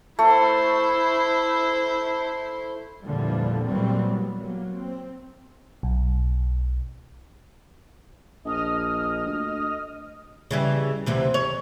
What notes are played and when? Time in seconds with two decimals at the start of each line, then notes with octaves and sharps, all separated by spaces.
0.19 A3 E4 C5
3.01 E2 A#2 D3 E3 F3 G3
3.66 A#2 E3 F#3 G3 A#3 C4
4.08 B3
4.37 F#3 A#3
4.73 C4
5.83 B1
8.45 A#1 D#5 D#6 F6
9.26 D2
10.51 C#3 E3 G3
11.06 D2 C3 E3
11.34 C#5